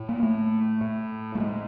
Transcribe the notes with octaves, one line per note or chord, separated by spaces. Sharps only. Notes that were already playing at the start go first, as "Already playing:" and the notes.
Already playing: A2
A#3
A3
A2
A3
G#3